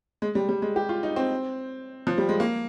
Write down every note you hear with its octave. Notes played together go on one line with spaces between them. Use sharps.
G#3
G3
G3
G#3
G4
F4
D#4
C4
F3
G3
G#3
A#3